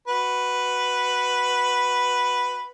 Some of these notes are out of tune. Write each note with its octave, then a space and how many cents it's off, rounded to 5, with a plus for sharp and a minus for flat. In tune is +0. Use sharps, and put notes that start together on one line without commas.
F#4 +0 B4 +0